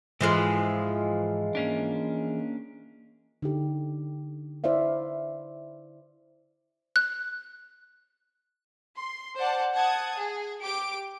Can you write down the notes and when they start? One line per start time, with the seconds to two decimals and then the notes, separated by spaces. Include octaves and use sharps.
0.21 G#2 E3 F3 G#3
1.55 A#3 C#4 D4
3.42 D3 D#4 G4
4.64 E4 C5 D5 E5 F5
6.96 F#6
8.97 C6
9.37 C5 D5 F#5 A5
9.75 F#5 A5 D#6 G#6
10.16 G#4
10.61 G4 D6 D7